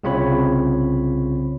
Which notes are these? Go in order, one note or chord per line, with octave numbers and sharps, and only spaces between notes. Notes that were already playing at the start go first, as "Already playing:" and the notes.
C2 C#3 C4 F4 C#5 B5